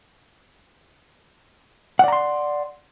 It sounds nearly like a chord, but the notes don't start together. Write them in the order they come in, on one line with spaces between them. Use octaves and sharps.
F#5 D5 A#5 C6